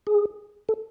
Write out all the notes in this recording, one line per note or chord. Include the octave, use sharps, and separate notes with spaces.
G#4
A4